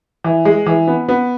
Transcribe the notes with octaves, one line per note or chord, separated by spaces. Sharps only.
E3
G#3
E3
B3
B3